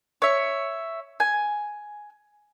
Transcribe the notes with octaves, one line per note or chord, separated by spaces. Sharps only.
C#5 E5
G#5